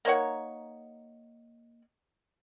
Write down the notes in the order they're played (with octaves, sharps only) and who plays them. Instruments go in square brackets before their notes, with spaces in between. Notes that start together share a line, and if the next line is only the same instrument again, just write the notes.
[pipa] A#3 D#4 C#5 F#5